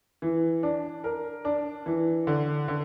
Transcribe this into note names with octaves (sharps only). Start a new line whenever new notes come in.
E3
D4
A#4
D4
E3
D3
D3